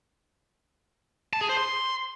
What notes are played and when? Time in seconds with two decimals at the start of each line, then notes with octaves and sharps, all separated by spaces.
1.33 A5
1.41 G#4
1.49 C5
1.57 C6